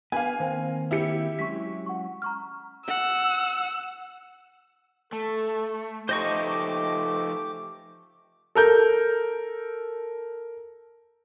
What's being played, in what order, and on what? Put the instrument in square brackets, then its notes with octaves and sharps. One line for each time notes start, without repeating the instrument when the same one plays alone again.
[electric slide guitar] B3 B4 [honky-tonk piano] F5 G#5
[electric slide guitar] D#3 A#3 C4 [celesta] C5 G5
[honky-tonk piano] E4 G4 C#7
[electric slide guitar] F#3 G#3 C#4 [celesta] C#6 B6
[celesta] F#5 C#6
A#5 C#6 F6
[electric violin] F#5 [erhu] E6
[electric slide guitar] A3 [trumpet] A4
[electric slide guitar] F3 D#4 [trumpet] A3 [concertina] G4 D6 [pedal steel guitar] C5 D#5 C#6
[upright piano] A4 A#4 G6